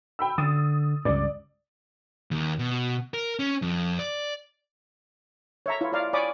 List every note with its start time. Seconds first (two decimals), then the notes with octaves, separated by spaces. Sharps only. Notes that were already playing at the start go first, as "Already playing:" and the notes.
0.19 G5 B5 E6
0.38 D3 D#6 A6
1.05 C#2 G2 D5
2.31 D#2
2.59 B2
3.14 A#4
3.39 C#4
3.62 F2
3.99 D5
5.66 C#5 E5 A#5
5.81 E4 F4 C#5
5.92 F4 C#5 D5 F5 A#5
6.13 C#5 D5 G#5 B5 D6 D#6